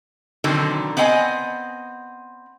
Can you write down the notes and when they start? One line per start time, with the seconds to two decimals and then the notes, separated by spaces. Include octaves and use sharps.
0.44 B2 D3 D#3 F#3 C4
0.97 B3 C4 D#5 F#5 G#5